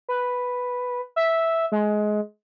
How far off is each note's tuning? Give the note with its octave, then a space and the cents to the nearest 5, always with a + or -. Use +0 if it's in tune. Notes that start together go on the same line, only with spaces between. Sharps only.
B4 +0
E5 -5
G#3 +20